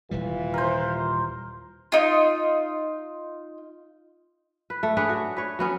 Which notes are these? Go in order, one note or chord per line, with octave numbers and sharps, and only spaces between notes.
D#1 C3 E3 G3 F4
A#4 C5
D#4 F4
B4
A3
D4 G#4 B4 C#5
F#4
B4 C#5
F#3 B3 C#4